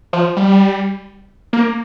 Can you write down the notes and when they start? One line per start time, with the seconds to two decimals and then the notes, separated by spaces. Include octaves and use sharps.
0.13 F3
0.36 G3
1.53 A#3